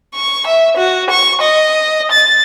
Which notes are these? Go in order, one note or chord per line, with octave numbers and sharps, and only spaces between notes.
C#6
E5
F#4
C#6
D#5
A6